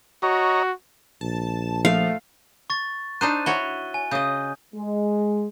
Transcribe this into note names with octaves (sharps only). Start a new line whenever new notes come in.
F#4 C#5 D#5 A#5
A#1 A5
F3 A3 F5
C#6 A6
D4 D#4 C5 F#6 D#7
E4 F#4 C#5 G7
G#5
C#3 D#5 D#6 G6
G#3